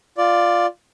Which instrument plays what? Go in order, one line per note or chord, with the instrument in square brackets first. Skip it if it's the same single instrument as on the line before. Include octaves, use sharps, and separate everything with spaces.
[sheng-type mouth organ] F4 D5